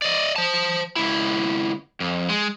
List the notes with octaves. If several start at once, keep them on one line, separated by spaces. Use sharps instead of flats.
D5 D#5
C5 A5
C#2 E4
F2
G#3